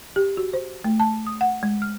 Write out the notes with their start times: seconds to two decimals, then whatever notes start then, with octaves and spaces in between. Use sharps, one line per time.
0.16 G4
0.37 F#4
0.53 C5
0.84 A3
1.00 A5
1.27 D#6
1.41 F#5
1.63 G#3
1.82 F6